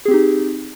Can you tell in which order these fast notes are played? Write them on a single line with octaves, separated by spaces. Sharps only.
G#4 C4 G4 D#4